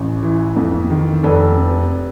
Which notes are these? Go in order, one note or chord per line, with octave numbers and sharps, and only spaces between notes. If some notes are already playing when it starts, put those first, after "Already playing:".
Already playing: A1
E3
F2
D#3
F1 A4 B4
C3